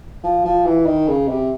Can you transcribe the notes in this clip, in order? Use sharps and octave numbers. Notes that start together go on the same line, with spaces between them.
F3
F3
E3
D#3
C#3
C3